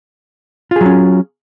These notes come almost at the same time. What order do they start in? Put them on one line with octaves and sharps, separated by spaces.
F4 G#4 F#3 C#4